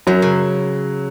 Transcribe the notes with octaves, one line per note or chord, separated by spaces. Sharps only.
F#2 F#3
C#3